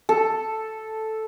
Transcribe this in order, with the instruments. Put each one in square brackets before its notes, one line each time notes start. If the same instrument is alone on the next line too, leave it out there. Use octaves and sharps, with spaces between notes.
[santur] A4